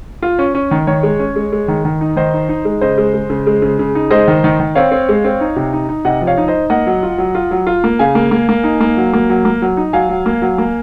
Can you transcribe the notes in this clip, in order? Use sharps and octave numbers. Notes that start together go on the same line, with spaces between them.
F4
C#4
C#4
D#3
D#3 C#5
G#3
C#4
G#3
G#3
D#3
D#3
D#4
D#3 C5 D#5
D#4
D#4
G#3
C#3 C5 D#5
G#3
G#3
C#3
G#3
C#3
C#3
D#4
G#3 C5 D#5
D#3
D#3
D#3
C4 C#5 F5
C4
G#3
C4
D#4
C3
D#4
D#4
C3 D#5 F#5
F3
C#5 F5
D#4
C5 D#5
D#4
A#3 D#5 F#5
F#3
F4
F#3
F4
F#3
F4
A#3
C#3 F5 G#5
A#3
A#3
A#3
D#4
A#3
F#3
A#3
F#3
A#3
F#3
D#4
F#3 F5 G#5
F#3
A#3
F#3
A#3